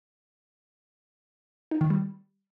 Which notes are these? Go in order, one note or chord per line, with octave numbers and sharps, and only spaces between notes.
D#4
D#3
G3